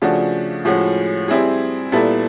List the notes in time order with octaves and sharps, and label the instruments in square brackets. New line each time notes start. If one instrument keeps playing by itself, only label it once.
[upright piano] C#3 F3 A3 D4 F#4
A2 F3 G#3 C#4 F#4
G3 C4 E4 G#4
A#2 G3 B3 E4 A4